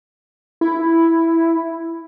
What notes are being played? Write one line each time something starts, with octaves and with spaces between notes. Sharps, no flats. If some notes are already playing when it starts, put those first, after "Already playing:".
E4